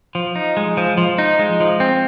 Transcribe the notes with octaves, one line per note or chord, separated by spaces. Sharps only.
F3
D#4
G#3
F3
F3
D#4
G#3
F3
C4